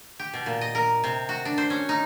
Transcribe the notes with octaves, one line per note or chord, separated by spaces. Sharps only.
G4
B2
A#2
D#5
A#4
C3
F#4
D4
C5
C#4
D#4